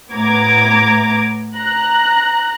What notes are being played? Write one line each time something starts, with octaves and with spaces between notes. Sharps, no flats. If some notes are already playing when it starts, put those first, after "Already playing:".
A2 B3 A#5 D6 G#6
A#5 F#6